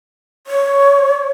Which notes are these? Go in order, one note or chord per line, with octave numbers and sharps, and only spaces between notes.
C#5